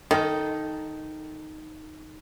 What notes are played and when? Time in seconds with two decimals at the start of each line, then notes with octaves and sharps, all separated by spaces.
0.11 D#3 D#4 A4